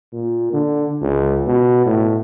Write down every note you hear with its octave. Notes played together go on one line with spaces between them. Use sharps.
A#2
D3
C#2
B2
A2